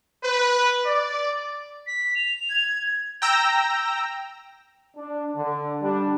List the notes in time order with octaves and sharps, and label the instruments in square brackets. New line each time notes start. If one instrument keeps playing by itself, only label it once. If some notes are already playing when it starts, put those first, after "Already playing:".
[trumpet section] B4
D5
[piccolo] B6
F7
[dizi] G#6
[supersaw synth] G5 A#5 E6 A#6
[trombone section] D4
D3
G3 D4